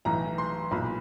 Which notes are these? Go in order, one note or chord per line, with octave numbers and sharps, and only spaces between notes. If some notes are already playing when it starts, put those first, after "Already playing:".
B1 A2 E3 A#5
C6
B1 A#2 B5